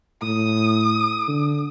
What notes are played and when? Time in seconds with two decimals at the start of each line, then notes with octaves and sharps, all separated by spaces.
0.22 A2 D#6
1.28 D3